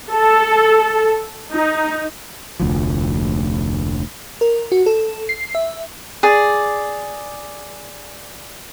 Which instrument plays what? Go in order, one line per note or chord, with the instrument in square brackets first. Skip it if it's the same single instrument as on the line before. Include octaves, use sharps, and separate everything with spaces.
[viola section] A4
D#4
[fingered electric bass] F1 D2 F3
[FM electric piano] A#4
F#4
A4
C7
E5
[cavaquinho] G#4 D5